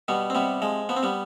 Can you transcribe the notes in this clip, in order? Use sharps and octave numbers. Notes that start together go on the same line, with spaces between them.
B2 G3 B3
C4
C3 G3 B3
F3 G#3
F3 B3
C4
G3 B3